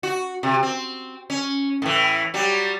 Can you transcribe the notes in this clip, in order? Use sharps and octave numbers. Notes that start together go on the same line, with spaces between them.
F#4
C3
C4
C#4
A2 E3
F#3 G3